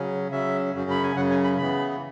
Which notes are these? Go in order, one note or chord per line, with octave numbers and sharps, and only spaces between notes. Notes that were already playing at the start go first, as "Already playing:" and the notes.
Already playing: C#3 F#3 C#4
C#3 F#3 C#4 E5
F#2 C#3 F#3 C#4
B5
G#5
F#2 C#3 F#3 C#4 F#5
G#5
B5
C#3 E3 B3 B5